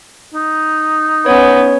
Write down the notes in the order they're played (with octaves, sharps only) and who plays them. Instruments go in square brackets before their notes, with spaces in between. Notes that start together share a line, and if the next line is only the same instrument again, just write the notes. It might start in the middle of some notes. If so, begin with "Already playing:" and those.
[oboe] D#4
[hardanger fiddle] B3 [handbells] C#4 C#5